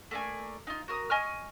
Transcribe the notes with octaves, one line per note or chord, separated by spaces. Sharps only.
A3 A#3 D5 G#5
D#4 F4
F#4 A#4 D#6
D#5 G#5 C#6 F6